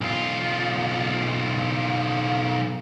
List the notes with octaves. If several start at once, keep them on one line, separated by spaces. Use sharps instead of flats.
B1 F4